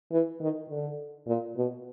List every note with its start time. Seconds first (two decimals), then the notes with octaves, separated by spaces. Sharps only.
0.12 E3
0.41 D#3
0.70 D3
1.27 A#2
1.56 B2